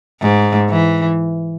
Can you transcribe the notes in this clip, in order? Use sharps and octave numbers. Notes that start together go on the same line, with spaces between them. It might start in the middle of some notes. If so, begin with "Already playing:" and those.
G#2
E3